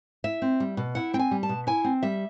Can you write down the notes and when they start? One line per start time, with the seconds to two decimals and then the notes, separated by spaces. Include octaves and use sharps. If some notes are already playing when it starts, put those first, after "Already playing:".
0.24 E4 E5
0.42 C4
0.60 G3
0.77 B2
0.95 E4 F#5
1.14 C4 G5
1.19 G#5
1.31 G3
1.43 A5
1.49 B2
1.67 E4 G#5
1.84 C4
2.03 G3 E5